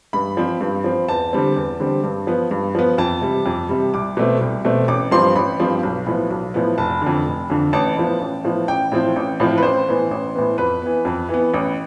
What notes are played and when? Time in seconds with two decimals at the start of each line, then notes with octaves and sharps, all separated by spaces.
0.13 G2 B5
0.37 F3 C4
0.61 G2
0.84 F3 C4
1.08 E2 A5
1.33 D3 G3 C4
1.56 E2
1.80 D3 G3 C4
2.04 G2
2.27 F3 B3
2.51 G2
2.75 F3 B3
2.98 F2 A5
3.22 C3 G3
3.46 F2
3.69 C3 G3
3.94 C2 D6
4.17 B2 A3 C4
4.41 C2
4.65 B2 A3 C4
4.88 A1 D6
5.11 G2 F3 C4 C6
5.36 A1 B5
5.60 G2 F3 C4
5.83 B1
6.06 A2 F3 B3
6.30 B1
6.54 A2 F3 B3
6.78 F1 A5
7.02 F2 D3
7.25 F1
7.50 F2 D3
7.73 A1 A5
7.96 A2 F3 B3
8.21 A1
8.44 A2 F3 B3
8.68 A1 G5
8.92 A2 F3 C4
9.16 A1
9.40 A2 F3 C4
9.58 B4
9.63 A1 C5
9.88 A2 E3 B3
10.11 A1
10.35 A2 E3 B3
10.58 F2 B4
10.82 E3 B3
11.05 F2
11.29 E3 B3
11.54 A1